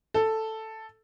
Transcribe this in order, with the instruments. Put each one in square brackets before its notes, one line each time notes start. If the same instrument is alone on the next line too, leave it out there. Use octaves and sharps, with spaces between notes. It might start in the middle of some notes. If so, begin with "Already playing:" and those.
[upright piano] A4